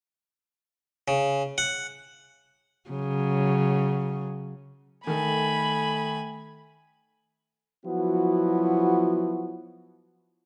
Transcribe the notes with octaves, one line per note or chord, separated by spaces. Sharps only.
C#3
F#5
C#3 F#3
D#3 A3 A4 G#5 B5
F3 F#3 B3 E4 F#4